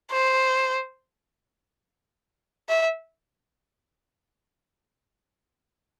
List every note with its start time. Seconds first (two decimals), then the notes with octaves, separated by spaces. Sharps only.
0.11 C5
2.69 E5